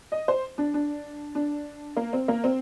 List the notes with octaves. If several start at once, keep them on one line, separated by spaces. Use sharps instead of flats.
D#5
C5
D4
D4
D4
A#3
C4
A#3
C4